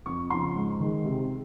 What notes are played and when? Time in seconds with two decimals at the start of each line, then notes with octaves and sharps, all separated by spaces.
0.06 F2 C#6
0.30 C#3 F3 C6
0.56 G#2
0.80 D#3 G#3
1.05 C3